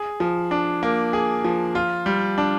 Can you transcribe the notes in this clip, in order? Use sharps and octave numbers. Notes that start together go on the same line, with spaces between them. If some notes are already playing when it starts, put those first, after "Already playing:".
Already playing: G#4
F3
D4
A#3
G#4
F3
F4
G3
D4